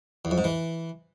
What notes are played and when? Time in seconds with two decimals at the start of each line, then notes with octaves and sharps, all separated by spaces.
0.25 E2
0.31 F2
0.38 G#2
0.44 E3